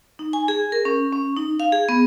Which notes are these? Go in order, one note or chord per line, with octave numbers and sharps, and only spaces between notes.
D#4
G#5
G#4
A#4
C#4
C#4
D#4
F5
G#4
B3